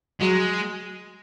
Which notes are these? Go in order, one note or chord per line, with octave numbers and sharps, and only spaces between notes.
F#3 G#3